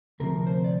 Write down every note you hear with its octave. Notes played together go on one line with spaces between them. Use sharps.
D2 C3 F3 A#4
C5
D5